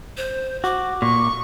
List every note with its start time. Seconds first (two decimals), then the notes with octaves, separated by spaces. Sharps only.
0.17 C5
0.64 F#4 D6
1.02 A#2 C#6